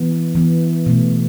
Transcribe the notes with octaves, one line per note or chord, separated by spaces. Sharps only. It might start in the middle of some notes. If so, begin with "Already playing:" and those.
Already playing: E3 B3
E3 B3
B2 A3